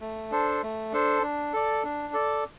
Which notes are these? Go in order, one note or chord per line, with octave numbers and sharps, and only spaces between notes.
A3
D4 A4 C5
A3
D4 A4 C5
D4
A4 D5
D4
A4 D5